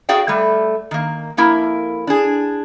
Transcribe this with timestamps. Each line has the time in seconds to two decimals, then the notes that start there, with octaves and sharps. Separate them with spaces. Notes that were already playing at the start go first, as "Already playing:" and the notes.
0.09 F#4 G#4 D5 F5 G5
0.28 G3 A3
0.91 D#3 A#3
1.37 F2 A#3 E4 A#4
2.07 D4 G#4